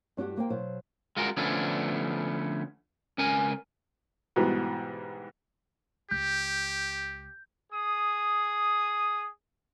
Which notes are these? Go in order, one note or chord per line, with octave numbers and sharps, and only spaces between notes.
G2 C#4 F#4 G4 F#5
A#3 C5 G5
B2 F#3 C5 F5
G#3 F4 F#4 A#4
D3 F3 A3 B3 C#4 D4
C#2 C#4 A#4 G#5
G#2 B2 E3 G3 B3
C#2 G4 G6
G#4 D#6